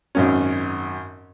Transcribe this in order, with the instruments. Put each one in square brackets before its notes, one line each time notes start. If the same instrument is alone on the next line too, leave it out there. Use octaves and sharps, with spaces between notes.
[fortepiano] G#1 F#2 C#4